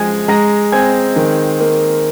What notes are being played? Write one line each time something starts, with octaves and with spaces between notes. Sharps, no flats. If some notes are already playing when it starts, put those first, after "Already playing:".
Already playing: F3 G#3 G#5 G#6
G#3 A#5 A#6
C4 G#5 G#6
D#3
A#3